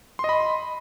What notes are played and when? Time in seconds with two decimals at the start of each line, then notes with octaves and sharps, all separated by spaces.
0.19 C6
0.24 D#5
0.29 B5